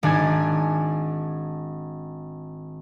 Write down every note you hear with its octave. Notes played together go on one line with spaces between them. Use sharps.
G#1 D4 G#5 G#6